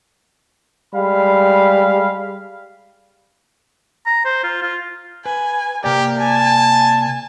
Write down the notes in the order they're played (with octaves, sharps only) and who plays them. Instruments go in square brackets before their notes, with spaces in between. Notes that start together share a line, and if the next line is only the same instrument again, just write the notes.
[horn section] G3 G#3 F5 B5
[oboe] A#5
C5
F4
F4
[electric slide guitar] B4 [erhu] G#5
[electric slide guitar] C3 A#3 D5 [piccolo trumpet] G4 [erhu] A#4
[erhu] G#5 [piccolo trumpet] A5
[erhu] G#5